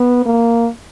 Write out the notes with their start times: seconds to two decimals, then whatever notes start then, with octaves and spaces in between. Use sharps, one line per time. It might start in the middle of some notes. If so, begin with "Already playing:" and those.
Already playing: B3
0.26 A#3